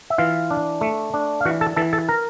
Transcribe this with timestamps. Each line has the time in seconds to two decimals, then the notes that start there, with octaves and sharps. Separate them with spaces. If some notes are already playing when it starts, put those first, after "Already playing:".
0.10 E5
0.18 E3 F4 F5
0.51 D4
0.81 A3
1.14 D4
1.41 F5
1.45 E3 F#4 F#5
1.61 A4 A5
1.76 E3 A4 A5
1.93 A4 A5
2.09 A#4 A#5